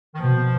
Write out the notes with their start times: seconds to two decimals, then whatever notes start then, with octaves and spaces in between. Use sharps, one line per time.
0.14 D#3
0.20 B2 F3